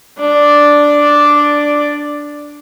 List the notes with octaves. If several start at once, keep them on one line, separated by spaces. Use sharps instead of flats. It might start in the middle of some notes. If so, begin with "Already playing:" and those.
D4 D5